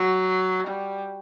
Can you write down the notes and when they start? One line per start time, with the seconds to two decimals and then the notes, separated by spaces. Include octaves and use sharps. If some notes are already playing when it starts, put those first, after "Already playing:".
Already playing: F#3
0.68 G3